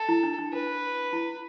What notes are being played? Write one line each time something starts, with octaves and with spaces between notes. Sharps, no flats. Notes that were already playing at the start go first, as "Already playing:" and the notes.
Already playing: A4
E4
D4
D4
D4 B4
E4